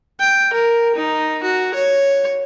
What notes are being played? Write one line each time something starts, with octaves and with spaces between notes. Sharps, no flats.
G5
A#4
D#4
F#4
C#5